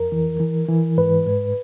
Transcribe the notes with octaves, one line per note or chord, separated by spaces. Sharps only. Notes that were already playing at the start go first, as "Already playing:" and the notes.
Already playing: F2 A#4
E3
E3
E3
G#2 B4
G#2